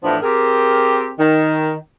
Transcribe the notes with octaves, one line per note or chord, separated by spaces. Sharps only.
A2 E3 F3 B3 D4
C4 G4 G#4 A#4
D#3